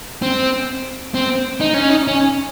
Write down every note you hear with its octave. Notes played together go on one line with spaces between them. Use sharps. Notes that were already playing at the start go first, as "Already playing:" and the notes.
C4
C4
D#4
C#4
D#4
C#4